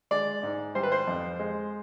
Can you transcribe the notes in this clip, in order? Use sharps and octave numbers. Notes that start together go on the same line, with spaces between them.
G#3 D5
G#2
G3 C5
B4
C5
F2
G#3